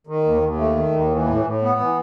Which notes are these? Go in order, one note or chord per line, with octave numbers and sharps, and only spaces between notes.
D#3
D#2
D#2
A3
D#3
D#2
E3
A2
A2
B3
E3